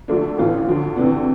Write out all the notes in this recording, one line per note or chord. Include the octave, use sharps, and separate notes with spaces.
D2 D3 F3 A3 D4
A1 A2 E3 B3 F4
D2 D3 F3
D2 C3 E3 B3 D4